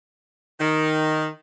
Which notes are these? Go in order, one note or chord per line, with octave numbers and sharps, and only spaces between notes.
D#3